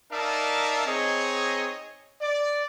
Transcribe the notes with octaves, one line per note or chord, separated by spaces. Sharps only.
D#4 A#4 D5 E5 F5 A5
C4 D#4 G#4 C#5 D#5
D5